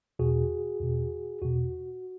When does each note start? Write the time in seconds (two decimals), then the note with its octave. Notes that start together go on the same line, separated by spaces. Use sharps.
0.19 E2 B2 F#4 G#4
0.80 E2 B2
1.42 E2 B2 F#4